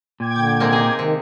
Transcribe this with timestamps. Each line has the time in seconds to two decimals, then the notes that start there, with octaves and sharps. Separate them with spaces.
0.20 A#2 G5 D6 G#6
0.36 D3
0.60 C3 G#3 A#3
0.73 D#4 G#4
0.99 C3 D#3